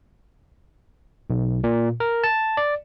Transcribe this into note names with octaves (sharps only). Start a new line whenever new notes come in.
B1
A#2
A#4
A5
D5